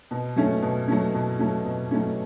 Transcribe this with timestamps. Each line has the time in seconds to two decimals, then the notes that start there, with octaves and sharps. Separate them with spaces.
0.11 B2
0.36 F#3 A3 C#4
0.62 B2
0.88 F#3 A3 C#4
1.14 B2
1.39 F#3 A3 C#4
1.65 B2
1.91 F#3 A3 C#4